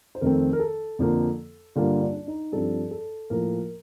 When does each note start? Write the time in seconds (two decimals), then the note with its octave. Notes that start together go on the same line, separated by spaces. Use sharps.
0.15 C5
0.21 F2 D#3 A3 C4 A#4
0.53 A#4
0.59 A4
0.99 F2 D3 F3 A#3
1.76 G2 D3 G3 A#3 F4
2.02 D4
2.16 D4
2.27 D#4
2.52 G2 F3 C4 A4
2.91 A4
3.30 A2 F3 A#3 A#4